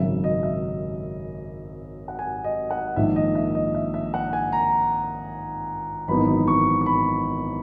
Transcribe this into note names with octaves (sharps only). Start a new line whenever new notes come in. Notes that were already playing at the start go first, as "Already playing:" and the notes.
Already playing: G#1 F#2 C#3 F#3 E5
D#5
E5
F#5
G#5
D#5
F#5
A#1 G#2 D#3 E5
D#5
E5
D#5
E5
E5
F#5
G#5
A#5
G#1 F#2 E3 B3 D#4 B5
C#6
C#6
B5